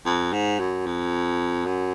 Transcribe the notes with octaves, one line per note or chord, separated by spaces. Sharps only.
F2
G#2
F#2
F2
F#2